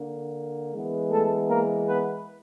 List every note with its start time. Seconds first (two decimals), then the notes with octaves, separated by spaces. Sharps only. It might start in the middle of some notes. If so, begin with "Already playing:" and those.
Already playing: D3 A#3
0.73 E3 G#3 B3
1.11 A3 A4
1.48 A#3 A#4
1.86 B3 B4